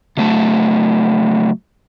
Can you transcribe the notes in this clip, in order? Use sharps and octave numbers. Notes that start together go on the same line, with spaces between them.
C#3 F#3 A3 A5